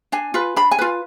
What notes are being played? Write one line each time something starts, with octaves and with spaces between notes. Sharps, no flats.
D4 G#5
F4 B4
D4 B5
G#5
F4 B4